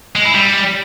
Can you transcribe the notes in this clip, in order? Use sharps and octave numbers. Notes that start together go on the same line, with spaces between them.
G#3
E4
G3